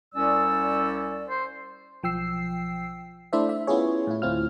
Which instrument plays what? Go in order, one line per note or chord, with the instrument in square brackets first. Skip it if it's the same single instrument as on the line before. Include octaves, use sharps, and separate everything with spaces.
[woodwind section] C2 C#4 D5 [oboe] E6
[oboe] C5
[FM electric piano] B1 F3 G5 E6 C7
A3 D4 E4 C5 D5 E5
E5
B3 C#4 E4 F4 G#4 C#5
A2 E4
D2 A2 C4 E4 F4 F6